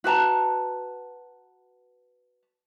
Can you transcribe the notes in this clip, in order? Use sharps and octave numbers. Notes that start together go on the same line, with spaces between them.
F#4 B4 A5 A#5